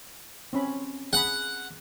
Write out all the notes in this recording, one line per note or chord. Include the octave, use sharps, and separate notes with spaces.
C4 C#4 B5
G#4 F#5 B5